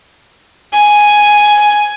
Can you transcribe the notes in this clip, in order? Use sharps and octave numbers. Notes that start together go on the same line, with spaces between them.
G#5